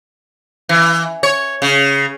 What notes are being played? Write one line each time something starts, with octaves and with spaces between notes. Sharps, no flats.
E3
C#5
C#3